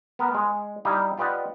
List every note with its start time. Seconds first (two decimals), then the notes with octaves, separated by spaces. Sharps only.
0.19 B3 A#4
0.34 G#3
0.85 G3 D#4 E4 F5
1.18 F4 G4 B4 D5 D#5 F#5